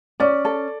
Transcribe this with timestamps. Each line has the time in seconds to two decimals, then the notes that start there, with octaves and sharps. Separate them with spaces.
0.20 C#4 D5
0.45 A4